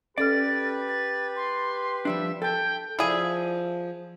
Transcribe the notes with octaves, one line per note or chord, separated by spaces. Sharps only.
C#4 G4 A4 B4 D5 F6 A6
A6
C6
F3 G3 D4 E5
A4 G5 A5
F3 E4 G#4 D5 E5 F5